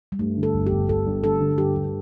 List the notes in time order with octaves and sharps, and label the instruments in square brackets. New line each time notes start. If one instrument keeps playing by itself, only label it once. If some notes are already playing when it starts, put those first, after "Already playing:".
[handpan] G3
[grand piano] G2 [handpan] A3
[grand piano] D3
[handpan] A4
[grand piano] G1
[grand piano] G1 [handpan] G4
[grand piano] G1 [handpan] A4
[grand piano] G2
[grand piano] D3 [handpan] A4
[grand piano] D3
[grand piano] G2 [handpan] G4
[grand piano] G2